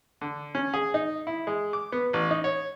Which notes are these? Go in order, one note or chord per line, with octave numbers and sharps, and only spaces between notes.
D3
C#4
G#4
D#4
E4
G#3
D6
B3
A1
D#4
C#5